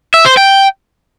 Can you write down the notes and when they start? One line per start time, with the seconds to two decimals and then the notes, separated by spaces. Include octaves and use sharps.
0.14 E5
0.26 C5
0.37 G5